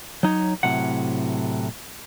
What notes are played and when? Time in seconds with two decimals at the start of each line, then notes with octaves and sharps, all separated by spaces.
0.23 F#3 D#4 C#5
0.63 A2 C3 F#3 F#5